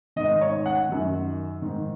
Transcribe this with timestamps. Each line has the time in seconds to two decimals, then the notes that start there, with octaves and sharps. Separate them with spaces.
0.16 G#2 D#3 D#5
0.41 C#5
0.66 F#5
0.89 F#2 D#3
1.62 G#2 D#3